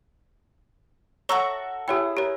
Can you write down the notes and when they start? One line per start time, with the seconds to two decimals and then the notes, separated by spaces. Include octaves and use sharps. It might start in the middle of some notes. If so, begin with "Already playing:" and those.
1.29 F#4 A4 C#5 E5 A#5 C#6 E6
1.88 E4 G4 G#4 C#5 G5
2.17 G4 A#4 C#5